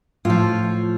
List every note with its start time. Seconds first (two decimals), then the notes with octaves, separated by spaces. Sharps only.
0.25 A2 F3 F4